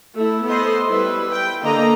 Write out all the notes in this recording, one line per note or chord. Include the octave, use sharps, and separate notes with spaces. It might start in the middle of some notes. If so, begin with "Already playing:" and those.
A3 E4
B3 A4 C5 D#5 C6
G3 E4 B4
B4 G5
D3 A#3 A4 D#5 A#5